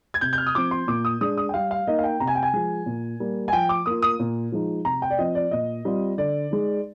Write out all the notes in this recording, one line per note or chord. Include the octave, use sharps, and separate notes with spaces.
G#6
C3 G6
G6
F6
D#6
F3 C4 D6
C6
A#2 D6
D#6
G#3 D4 D#6
D#6
G5
G3 F5
F5
A#3 D#4 D#5
F5
G5
C3 A#5
G#5
G5
G#5
F3 G#3
A#2
G3 A#3
G#5
F3 G5
D6
A#3 F4 D#6
D#6
A#2
F3 G#3 D#4
C3 A#5
G5
D5
F3 C4 D#5
D5
A#2 D#5
G3 C4 F4
D3 D5
G#3 D#4